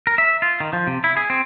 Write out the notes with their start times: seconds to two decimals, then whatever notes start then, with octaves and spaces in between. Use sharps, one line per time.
0.07 A#4
0.18 E5
0.42 F4
0.60 D#3
0.73 F3
0.87 C3
1.04 E4
1.17 G#4
1.30 C4